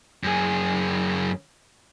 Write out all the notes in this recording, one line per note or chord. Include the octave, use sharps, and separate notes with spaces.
F#2 G#4